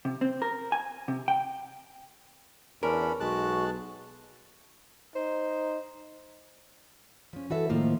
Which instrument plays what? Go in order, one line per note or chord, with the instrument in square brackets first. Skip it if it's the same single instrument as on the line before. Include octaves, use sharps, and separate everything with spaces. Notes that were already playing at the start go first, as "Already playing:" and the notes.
[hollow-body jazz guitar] C3
C4
A#4
G#5
C3
G5
[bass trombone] E2 [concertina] C#4 D4 B5 [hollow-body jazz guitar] A#4
[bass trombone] B1 [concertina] G#3 A5 F#6 [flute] F#4
[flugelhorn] D#4 [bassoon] C5
[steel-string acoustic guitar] F3 C#4
E3 F#4 A4 E5
A2 D#3 F3 A#3 C5